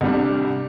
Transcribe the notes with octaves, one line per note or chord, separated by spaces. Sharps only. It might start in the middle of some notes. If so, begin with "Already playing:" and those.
C2 C3 G3 D4